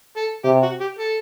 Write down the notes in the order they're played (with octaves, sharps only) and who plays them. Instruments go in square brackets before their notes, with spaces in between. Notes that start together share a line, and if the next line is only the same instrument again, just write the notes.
[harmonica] A4
[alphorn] C3 [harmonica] G4
[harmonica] F#4
G4
A4